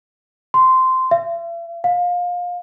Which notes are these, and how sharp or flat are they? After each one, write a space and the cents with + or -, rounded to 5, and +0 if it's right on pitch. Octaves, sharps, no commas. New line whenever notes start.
C6 -10
E5 +45
F5 +25